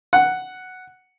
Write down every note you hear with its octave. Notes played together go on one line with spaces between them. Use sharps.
F#5